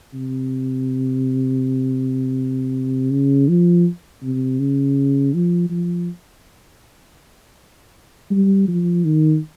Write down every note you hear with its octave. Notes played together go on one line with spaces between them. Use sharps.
C3
C#3
F3
C3
C#3
F3
F3
G3
F3
D#3